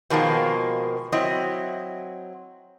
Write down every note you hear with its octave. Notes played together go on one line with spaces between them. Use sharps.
B2 D#3 F3 G#3 A#3
F#3 C4 E4 D#5